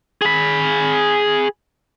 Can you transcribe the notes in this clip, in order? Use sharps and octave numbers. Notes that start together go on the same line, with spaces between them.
G#4 B5